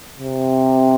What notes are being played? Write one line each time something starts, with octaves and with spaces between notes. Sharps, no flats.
C3